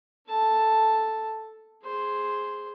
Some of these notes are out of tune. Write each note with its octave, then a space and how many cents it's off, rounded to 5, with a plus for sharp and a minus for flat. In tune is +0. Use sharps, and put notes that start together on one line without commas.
A4 +0 A5 +0
G#4 +0 C5 +0